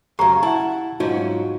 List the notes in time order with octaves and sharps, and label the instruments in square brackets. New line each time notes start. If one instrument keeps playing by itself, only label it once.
[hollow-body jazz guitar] F#2 C#3 [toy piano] G4 A#5 C#6
[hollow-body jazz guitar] E4 [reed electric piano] F#5 A5
[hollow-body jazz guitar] G#2 F#3 C#4 [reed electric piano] D#4 F4 F#4